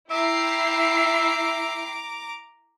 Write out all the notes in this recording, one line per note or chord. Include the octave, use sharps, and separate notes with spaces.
E4 E5 G5 A#5 D6 C7